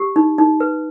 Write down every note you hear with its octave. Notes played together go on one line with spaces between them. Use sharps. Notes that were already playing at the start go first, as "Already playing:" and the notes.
Already playing: G4
D#4
D#4
B4